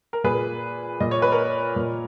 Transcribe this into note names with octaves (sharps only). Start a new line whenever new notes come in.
A#4
A#2 G#4 B4
A#2 D#5
C#5
B4
A#4 C#5
A#2